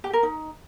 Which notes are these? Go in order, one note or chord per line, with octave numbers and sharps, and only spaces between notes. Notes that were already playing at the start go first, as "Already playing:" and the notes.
G4
A#4
D#4